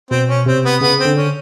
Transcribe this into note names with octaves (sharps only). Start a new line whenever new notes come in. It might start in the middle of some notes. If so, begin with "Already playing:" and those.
B2 C4
C#4
C3 C4
B3
C#3 B3
C4
D3
C#4